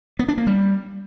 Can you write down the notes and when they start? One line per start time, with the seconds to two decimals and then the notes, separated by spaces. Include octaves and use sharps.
0.19 B3
0.28 D4
0.38 A#3
0.47 G3